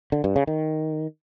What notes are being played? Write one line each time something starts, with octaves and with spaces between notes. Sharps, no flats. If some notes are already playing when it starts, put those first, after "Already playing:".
D3
G2
C#3
D#3